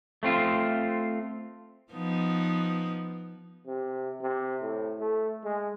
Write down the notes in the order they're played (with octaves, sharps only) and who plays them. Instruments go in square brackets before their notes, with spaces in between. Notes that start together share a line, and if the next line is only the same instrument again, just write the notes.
[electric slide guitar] A3 C4 F4
[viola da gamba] F3 B3 D#4
[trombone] C3
C3
A2
A3
G#3